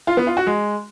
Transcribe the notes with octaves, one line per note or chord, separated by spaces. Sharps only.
F4
B3
F4
F#4
G#3